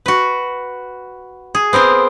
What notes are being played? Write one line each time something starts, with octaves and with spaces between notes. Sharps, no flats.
F#4 B4
G#4
B3 C4 A#4 C5